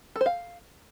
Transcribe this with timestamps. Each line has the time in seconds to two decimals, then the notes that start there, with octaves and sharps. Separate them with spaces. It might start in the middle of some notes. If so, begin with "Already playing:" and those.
0.16 A4
0.21 C5
0.26 F5